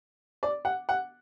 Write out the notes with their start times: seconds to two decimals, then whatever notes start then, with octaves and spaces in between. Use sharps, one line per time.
0.43 D5
0.65 F#5
0.89 F#5